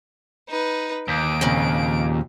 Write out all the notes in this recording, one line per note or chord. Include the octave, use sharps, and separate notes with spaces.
D#4 B4
D#2 D7
F2 A#2 C#3